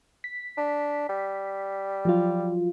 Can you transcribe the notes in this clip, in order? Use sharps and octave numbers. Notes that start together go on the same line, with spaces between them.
B6
D4
G3
F3 F#3 F4